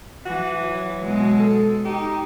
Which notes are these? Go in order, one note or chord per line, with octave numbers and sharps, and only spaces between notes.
E3 F#4
F#3
B2 G#3
A4
D#4 G4